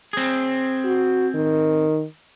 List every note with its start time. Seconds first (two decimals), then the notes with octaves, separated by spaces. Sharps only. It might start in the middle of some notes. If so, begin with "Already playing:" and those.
0.13 C4 G#4
0.85 F#4
1.35 D#3